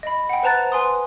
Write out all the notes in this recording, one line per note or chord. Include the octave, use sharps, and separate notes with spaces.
D#5 B5
F#5 G5
B4 C5 A5 A#5 F#6 A6
B4 G#5 C6 D#6